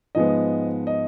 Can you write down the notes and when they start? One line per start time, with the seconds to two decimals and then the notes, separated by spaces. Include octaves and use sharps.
0.15 G#2 F3 G#3 B3 D#5
0.87 D#5